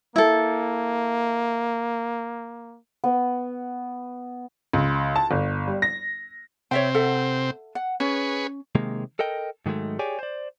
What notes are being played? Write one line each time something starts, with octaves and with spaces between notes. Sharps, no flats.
A#3 E4 A4
B3
C#2
A5
G1
G3
A#6
C3 C4 C#5 E5 G5
A4 E5 F#5
F#5
C#4 G#4 B4 C#5
C3 D#3 G#3 A#3
A4 A#4 D#5 G5
G#2 D#3 F#3 G#3 A3
G4 G#4 C#5 D5 G5 G#5
C5 D5